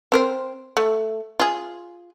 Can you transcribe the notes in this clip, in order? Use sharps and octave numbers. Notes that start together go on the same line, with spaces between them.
C4 A#4 C5
A3
F4 G#4